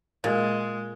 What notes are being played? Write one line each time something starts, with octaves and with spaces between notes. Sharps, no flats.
A#2 G#3